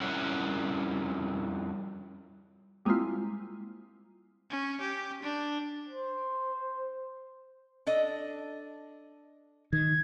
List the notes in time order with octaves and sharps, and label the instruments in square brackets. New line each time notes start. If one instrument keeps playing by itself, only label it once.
[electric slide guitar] F2 G3 C#4 E4 A#4 F#5
[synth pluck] G3 G#3 A#3 C4 E4 F4
[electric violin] C#4
G4
D4
[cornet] C5
[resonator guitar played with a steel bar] D4 A4 D#5
[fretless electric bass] D#3 [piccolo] G#6